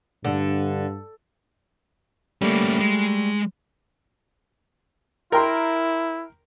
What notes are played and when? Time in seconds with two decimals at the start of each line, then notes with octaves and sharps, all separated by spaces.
0.24 G2 D3
2.42 G3 A3 A#3 C#4
2.80 G#3
5.32 E4 A#4 G5 C6